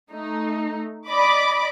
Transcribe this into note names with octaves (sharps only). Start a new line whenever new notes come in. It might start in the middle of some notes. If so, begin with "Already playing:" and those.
A3 D#4
D5 D#5 B5 D6